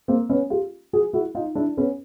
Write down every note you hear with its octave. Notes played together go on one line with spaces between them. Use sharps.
A#3 C4
B3 C#4
F4 G4
F#4 G#4
E4 F#4
D#4 F4
D4 E4
B3 C#4